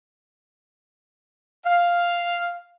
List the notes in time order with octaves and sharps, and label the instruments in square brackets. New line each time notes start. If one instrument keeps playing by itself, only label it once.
[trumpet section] F5